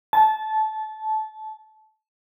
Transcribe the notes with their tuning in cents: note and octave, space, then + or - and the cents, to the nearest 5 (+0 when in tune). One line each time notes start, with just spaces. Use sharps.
A5 -20